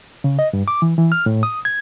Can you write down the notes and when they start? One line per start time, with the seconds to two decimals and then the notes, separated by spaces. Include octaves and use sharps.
0.24 C#3
0.39 D#5
0.53 G2
0.68 D6
0.82 E3
0.98 E3
1.12 F6
1.26 A2
1.43 D#6
1.65 G#6